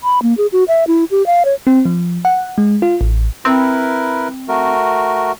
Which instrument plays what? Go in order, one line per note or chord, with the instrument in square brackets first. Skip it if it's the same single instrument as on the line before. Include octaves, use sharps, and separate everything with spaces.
[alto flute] B5
A#3
G#4
F#4
E5
E4
G4
F5
C#5
[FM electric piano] C4
F3
F#5
G#3
F4
A1
[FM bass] C4 [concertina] E4 A#4 B4
[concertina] A3 F#4 A#4